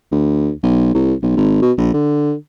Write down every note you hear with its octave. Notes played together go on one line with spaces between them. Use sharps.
D2
B1
C2
B1
G#1
B2
A#1
D3